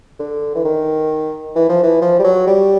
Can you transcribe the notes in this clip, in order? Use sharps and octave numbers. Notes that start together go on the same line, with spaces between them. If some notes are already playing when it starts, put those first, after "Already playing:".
D3
E3
D#3
E3
F3
E3
F3
G3
F#3
G3